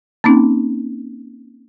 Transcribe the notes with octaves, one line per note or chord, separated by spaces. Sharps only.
A#3 C4 C#4 D#4